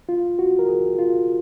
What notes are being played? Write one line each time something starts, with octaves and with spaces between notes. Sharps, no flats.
F4
F#4
A#4
G#4
F4